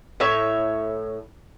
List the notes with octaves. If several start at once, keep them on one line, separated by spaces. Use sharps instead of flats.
A2 C#5 E5